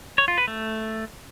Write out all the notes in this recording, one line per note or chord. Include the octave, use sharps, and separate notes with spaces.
C#5
F4
B4
A3